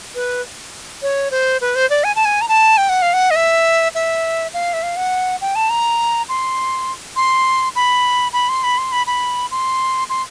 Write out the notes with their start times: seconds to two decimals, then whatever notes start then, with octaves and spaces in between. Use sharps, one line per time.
0.15 B4
1.02 C#5
1.31 C5
1.61 B4
1.75 C5
1.90 D5
2.04 G#5
2.16 A5
2.25 G#5
2.41 A#5
2.49 A5
2.77 G5
2.89 F#5
3.02 F5
3.13 F#5
3.31 D#5
3.36 E5
3.95 E5
4.54 F5
4.73 E5
4.83 F5
4.97 F#5
5.41 G5
5.55 A5
5.70 A#5
6.29 C6
7.16 C6
7.76 B5
8.33 B5
8.49 C6
8.64 B5
8.78 C6
8.92 B5
9.07 B5
9.51 C6
10.10 C6